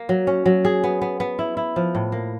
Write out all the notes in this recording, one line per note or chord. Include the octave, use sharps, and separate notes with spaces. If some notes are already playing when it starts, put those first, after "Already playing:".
Already playing: A#3
F#3
C#4
F#3
G#4
B3
B3
B3
E4
E4
F3
A2
A#3